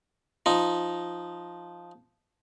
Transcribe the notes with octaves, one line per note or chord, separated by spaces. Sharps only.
F3 D#4